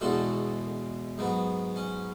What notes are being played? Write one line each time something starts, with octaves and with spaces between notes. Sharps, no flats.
E2 B2 G#3 F#4 A4
G#2 F#3 B3
C#4